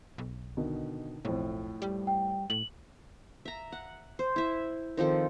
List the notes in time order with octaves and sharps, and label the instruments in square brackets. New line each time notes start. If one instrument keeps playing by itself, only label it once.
[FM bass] B1
[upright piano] B2 D3 D#3
[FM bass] B1 [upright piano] F2 A2
[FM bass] G3
[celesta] G5
[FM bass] A2 [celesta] F#7
[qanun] E5 A#5
F#5
C5
E4 E5
D#3 F3 C4 A4